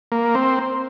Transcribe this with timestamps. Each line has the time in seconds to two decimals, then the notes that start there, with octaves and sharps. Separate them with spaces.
0.12 A#3
0.35 C4